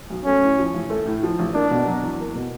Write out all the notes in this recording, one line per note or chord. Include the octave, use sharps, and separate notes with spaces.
B1
A3 C#4
A2
F3
A1
A3
A2
F3
A1
A#3 D4
B2
F#3
E2
A#3
B2